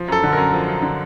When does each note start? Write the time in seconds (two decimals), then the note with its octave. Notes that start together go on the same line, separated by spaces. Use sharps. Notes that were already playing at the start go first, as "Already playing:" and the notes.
Already playing: F3
0.08 F#2 A4
0.23 D3
0.33 F#2 A#4
0.53 F3
0.68 F#2
0.82 D3